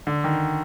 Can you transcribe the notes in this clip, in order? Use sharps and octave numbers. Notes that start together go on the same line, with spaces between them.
D3
D#3